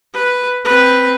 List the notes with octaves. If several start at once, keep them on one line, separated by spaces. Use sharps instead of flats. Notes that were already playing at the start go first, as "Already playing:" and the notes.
B4
C4 B4